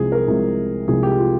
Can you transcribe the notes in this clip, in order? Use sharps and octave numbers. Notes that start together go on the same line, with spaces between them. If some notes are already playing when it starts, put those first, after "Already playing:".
Already playing: C2 C3 F3 G#3 G#4
A#4
C2 C3 F3 G#3
C2 C3 F3 G#3 G#4
G4
F4